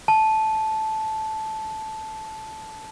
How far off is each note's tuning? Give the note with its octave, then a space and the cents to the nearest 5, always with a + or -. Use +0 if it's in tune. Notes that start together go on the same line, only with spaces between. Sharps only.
A5 -10